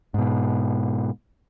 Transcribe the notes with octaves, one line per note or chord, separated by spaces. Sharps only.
G#2 B2